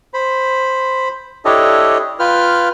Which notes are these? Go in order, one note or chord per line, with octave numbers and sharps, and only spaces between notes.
C5 B5
D4 E4 G4 A4 C#5 D#5
F4 B4 G5 F6